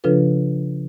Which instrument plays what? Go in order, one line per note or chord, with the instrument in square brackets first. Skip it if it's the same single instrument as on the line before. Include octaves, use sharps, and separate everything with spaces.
[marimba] C#3 F3 D4 F4 A4 B4